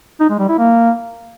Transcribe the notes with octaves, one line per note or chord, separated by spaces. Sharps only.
D#4
G#3
G3
E4
A#3